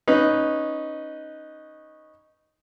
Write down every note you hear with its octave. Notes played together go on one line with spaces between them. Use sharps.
C#4 D#4 B4